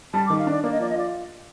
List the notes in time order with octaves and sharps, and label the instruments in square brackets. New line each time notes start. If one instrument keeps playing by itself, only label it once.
[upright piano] G3 [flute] A5
[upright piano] D#3 [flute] D6
[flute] F5
[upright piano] D4 [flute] D5
[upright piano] A#3 [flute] D5
[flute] D#5
[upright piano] F3 [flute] D5
[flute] D#5
[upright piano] F4 [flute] D5